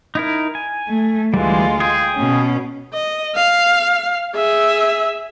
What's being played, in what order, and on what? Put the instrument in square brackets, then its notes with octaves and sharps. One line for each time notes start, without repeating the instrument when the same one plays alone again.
[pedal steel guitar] D#4 E4 A#4
G#5
[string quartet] A3
[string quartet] D2 G#3 F4 [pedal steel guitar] E3 G3
[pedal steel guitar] G#4 G5 G#5
[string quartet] B2 C#4
[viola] D#5
F5
G#4 E5